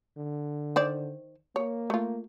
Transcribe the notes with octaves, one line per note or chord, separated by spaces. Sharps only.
D3
D#3 C5 D5
A#3 C#5
A3 F4